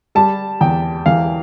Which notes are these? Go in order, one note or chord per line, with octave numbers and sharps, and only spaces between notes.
G3 A5
E2 G5
E3 F5